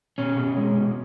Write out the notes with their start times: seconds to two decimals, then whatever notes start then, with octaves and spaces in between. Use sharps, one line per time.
0.18 B2 C#4
0.37 B2
0.57 G#3
0.78 B2